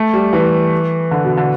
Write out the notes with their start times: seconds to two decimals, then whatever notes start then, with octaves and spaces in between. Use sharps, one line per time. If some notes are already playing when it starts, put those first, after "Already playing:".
Already playing: A3
0.13 G3
0.33 E3
1.11 D3
1.24 B2
1.37 D3